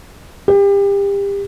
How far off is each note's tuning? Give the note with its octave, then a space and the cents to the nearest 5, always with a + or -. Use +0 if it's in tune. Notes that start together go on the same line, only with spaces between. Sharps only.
G4 +30